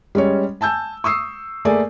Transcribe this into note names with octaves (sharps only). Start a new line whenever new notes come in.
G3 G#3 C#4 C#5
G#5 A5 E6 G6
C#6 D#6 E6 C7
A3 A#3 G#4 D5 G#5